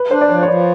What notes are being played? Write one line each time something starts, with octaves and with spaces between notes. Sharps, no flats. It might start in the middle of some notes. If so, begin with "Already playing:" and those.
Already playing: B4
D4 C5
D5
F3 C#5
C#5
F3 D5